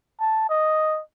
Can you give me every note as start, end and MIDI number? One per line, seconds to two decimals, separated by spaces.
0.20 0.45 81
0.49 1.01 75